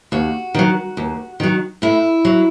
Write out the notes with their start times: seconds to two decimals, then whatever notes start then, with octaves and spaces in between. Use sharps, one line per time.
0.12 D#2 F#4
0.55 D#3 F#3
0.97 D#2
1.40 D#3 F#3
1.82 A2 E4
2.25 F#3